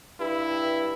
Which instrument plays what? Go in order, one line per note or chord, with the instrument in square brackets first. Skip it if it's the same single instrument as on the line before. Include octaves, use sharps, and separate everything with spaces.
[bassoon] G2 [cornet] E4